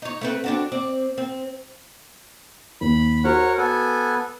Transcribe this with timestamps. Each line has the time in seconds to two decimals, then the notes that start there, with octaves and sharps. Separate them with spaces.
0.02 D#4 C#5
0.21 A3 C4 B4
0.44 C4 D4 F#4
0.72 C4 D5
1.18 C4
2.81 D#2 B5
3.24 F#4 A#4 C5 C#5 F#5
3.58 B3 A4 G#5